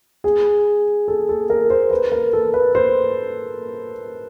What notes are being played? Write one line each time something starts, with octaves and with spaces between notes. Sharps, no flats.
G#4
A4
A4
A#4
C5
B4
A#4
A4
B4
C5